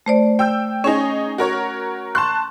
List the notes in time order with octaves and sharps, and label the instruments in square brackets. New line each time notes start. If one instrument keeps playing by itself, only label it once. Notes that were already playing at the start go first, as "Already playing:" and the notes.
[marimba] A3 C5 D5
[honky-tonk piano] G5 E6 G6
[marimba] C#4 [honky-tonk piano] D#4 G#4 C#5
[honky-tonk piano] F#4 A#4 C#5
[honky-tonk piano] A5 C6 F#6 [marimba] C#6